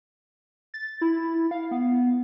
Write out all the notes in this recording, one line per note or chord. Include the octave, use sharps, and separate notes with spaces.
A6
E4
F5
B3